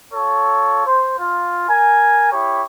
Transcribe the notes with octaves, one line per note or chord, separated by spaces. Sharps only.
F4 A4 C#5
C5
F4
A#4 G#5
E4 G4 C#5